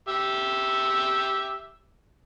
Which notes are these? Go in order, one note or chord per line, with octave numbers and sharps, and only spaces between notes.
G4 E5